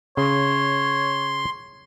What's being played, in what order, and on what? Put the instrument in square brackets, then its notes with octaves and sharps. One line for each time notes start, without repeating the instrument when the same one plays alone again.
[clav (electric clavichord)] C#3 [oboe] C#5 [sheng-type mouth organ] C6